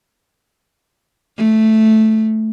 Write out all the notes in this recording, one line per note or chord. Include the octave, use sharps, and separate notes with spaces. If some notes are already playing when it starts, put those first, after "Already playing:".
A3